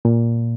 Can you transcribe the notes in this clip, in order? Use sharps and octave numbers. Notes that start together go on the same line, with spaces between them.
A#2